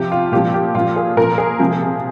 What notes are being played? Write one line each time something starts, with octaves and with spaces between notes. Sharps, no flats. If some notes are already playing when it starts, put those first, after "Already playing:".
Already playing: C3 F3 G4
F4
A#2 F3 G4
G4
A#2 F3 F4
G#4
A#2 F3 A#4
G#4
C3 F3